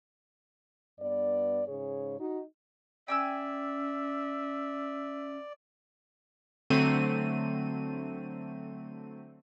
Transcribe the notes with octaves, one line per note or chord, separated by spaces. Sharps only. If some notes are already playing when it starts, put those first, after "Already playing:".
G2 B3 D5
G#2 C#3 G#4 C#5
D#4 F#4
C#4 D5 E5 G5 G#5 E6
D3 F#3 A3 C4 D#7